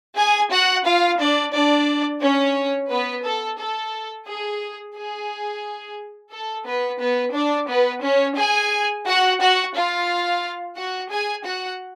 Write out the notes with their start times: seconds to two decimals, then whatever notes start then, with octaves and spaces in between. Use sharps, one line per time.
0.16 G#4 G#5
0.50 F#4 F#5
0.85 F4 F5
1.19 D4 D5
1.53 D4 D5
2.21 C#4 C#5
2.89 B3 B4
3.24 A4
3.58 A4
4.27 G#4
4.95 G#4
6.31 A4
6.66 B3 B4
7.00 B3 B4
7.34 D4 D5
7.69 B3 B4
8.02 C#4 C#5
8.37 G#4 G#5
9.05 F#4 F#5
9.40 F#4 F#5
9.74 F4 F5
10.77 F#4 F#5
11.11 G#4 G#5
11.45 F#4 F#5